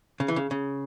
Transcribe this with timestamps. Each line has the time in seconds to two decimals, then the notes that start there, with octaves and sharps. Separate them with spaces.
0.20 C#3
0.28 E3
0.36 C#3
0.51 C#3